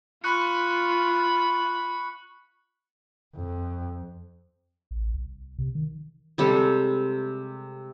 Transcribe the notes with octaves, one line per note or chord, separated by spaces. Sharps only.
F4 B5 C#6 F#6 C#7
F2
A1
C2
C3
D#3
C3 G3 G#3 A4